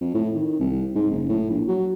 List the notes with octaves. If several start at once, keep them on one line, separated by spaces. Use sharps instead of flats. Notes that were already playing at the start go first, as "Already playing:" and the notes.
F2
A2
D#3
C2
G#2
F#1
A2
A#1
F#3